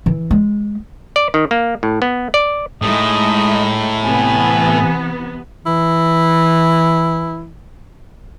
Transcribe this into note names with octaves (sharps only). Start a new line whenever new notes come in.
E3
G#3
D5
D#3
A#3
A2
B3
D5
A2 G#3 D#4 D#5 E5
C3 E3 B3 G#5
E3 E4